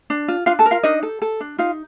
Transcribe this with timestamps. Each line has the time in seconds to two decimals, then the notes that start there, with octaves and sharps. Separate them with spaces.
0.10 D4
0.28 F4
0.46 D4 F4 F5
0.59 A4 A5
0.66 A#4
0.71 F4 F5
0.83 D4 D#4 D#5
1.03 A4
1.22 A4
1.40 D4
1.58 D#4 F4 F5